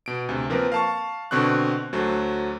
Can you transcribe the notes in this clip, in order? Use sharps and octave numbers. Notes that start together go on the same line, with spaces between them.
B2 D7
D2 C3
F3 A#3 C4 A#4 B4
F5 A5 C#6
B2 D3 C4 C#6 F#6
D2 F#3 A3 C5